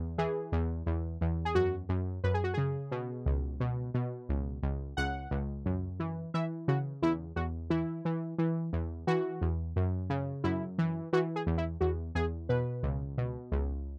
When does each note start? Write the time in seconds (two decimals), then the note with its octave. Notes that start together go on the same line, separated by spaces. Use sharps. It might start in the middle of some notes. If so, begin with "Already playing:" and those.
Already playing: E2
0.18 E3 G#4
0.52 E2
0.86 E2
1.21 E2
1.45 G#4
1.55 F#2 F#4
1.89 F#2
2.24 F#2 B4
2.34 G#4
2.44 F#4
2.54 C#3 G#4
2.92 B2
3.26 C#2
3.60 B2
3.94 B2
4.29 C#2
4.63 C#2
4.97 C#2 F#5
5.31 C#2
5.66 F#2
6.00 E3
6.34 E3 E5
6.68 C#3 F#4
7.02 E2 E4
7.36 E2 F#4
7.70 E3 E4
8.05 E3
8.38 E3
8.73 E2
9.07 E3 F#4
9.41 E2
9.76 F#2
10.10 C#3
10.44 F#2 E4
10.78 E3
11.13 E3 F#4
11.36 G#4
11.47 E2
11.58 E4
11.81 E2 F#4
12.15 E2 G#4
12.49 B2 B4
12.83 C#2
13.18 B2
13.52 C#2